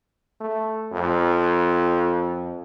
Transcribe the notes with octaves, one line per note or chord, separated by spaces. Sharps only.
A3
F2